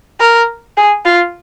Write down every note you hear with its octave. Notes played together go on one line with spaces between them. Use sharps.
A#4
G#4
F4